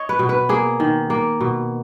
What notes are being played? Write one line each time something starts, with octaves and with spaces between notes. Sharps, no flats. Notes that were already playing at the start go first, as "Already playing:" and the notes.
Already playing: C#5 D#5
B4
B2
B4
A#3 G#4
D#3
A#3
B2